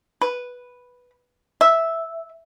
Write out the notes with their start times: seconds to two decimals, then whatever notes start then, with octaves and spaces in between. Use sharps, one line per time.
0.22 B4
1.61 E5